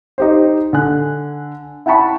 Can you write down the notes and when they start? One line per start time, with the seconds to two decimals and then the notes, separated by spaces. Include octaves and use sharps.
0.18 D#4 G4 C5
0.73 D3 G#5 F#6
1.86 E4 F#5 G5 A5 B5 C#6